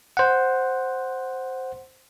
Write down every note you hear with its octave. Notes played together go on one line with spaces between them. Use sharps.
C5 F#5